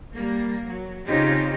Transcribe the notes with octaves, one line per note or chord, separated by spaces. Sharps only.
G3 A#3
F#3
C#3 C4 C#4 D#4 F4 G4